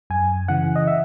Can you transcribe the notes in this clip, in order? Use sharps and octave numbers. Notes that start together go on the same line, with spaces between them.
F#2 G#5
C#3 E3 F#5
D#5
E5